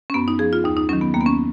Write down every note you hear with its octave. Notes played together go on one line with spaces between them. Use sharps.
C#4
F#2 B3
D#4
F3 G#4
F4
D#2 D#4
D#4
D#3 F#3 C#4
B3
D#2 A#3
B3
C#4